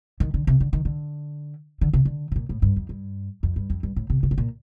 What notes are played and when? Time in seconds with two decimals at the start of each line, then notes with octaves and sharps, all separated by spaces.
0.20 D#3
0.34 D3
0.47 C3
0.60 D3
0.73 D#3
0.85 D3
1.81 D3
1.93 C3
2.05 D3
2.32 C3
2.36 A#2
2.49 A2
2.62 G2
2.76 F2
2.89 G2
3.43 F2
3.56 G2
3.70 F2
3.83 G2
3.96 A2
4.10 C3
4.23 C3
4.31 A2
4.38 A#2